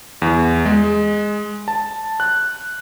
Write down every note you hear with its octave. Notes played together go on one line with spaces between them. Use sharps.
E2
G#3
A5
F#6